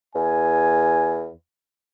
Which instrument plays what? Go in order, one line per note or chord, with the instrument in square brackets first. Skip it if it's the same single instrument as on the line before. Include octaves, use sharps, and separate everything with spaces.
[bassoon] E2 [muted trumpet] G#5